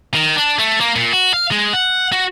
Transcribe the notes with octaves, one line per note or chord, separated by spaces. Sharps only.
D#3
D4
A3
A#3
A#2
F#4
F5
G#3
F#5
F#4